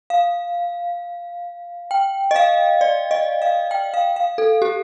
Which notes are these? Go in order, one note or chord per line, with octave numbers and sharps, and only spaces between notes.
F5
G5
D#5
F5
D5
D#5
F5
G5
F5
F5
A4
G4